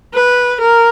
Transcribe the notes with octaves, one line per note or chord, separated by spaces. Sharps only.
B4
A#4